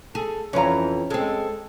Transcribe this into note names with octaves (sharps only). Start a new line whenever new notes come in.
G#4 A4
F2 E3 C#4 E4 F4 A#5
G#3 C4 A4